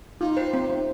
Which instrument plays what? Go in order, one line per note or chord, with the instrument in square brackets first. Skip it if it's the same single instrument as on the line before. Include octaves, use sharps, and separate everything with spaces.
[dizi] D#4 [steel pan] F4
[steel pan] C5
C4
C4